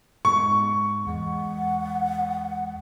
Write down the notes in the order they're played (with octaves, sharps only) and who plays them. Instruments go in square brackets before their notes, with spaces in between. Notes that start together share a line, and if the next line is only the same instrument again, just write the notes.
[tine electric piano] G#2 G#3 B3 [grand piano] C#6
[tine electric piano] E2 G#3 [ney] F#5